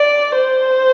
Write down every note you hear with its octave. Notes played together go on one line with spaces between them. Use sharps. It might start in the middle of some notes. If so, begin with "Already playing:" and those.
Already playing: D5
C5